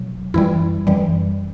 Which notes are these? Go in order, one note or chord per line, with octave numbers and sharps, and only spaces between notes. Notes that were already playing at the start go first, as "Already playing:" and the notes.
Already playing: B2 F#3
F#2 E3 G3 E4
F#2 E3 G3